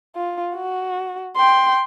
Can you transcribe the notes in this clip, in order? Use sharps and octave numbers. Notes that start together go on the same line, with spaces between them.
F4
F#4
G5 C6